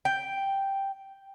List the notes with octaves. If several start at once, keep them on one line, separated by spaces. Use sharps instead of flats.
G5